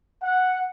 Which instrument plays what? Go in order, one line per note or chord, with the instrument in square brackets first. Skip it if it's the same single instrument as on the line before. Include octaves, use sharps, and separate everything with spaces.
[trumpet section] F#5